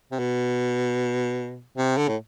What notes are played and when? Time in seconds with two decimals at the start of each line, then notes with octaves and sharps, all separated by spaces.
0.12 C3
0.19 B2
1.77 C3
1.97 D3
2.08 A2